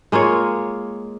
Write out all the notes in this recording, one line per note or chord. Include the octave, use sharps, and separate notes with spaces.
G#3 A#3 F4 C#5